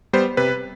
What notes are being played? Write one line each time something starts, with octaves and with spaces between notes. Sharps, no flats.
G3 B3 C5
C3 B4